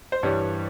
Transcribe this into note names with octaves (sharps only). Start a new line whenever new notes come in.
C5
G2 E3 G3 C#5